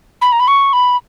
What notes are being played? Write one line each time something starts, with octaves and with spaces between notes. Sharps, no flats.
B5
A#5
B5
C#6
B5